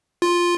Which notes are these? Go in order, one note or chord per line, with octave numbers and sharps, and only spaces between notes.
F4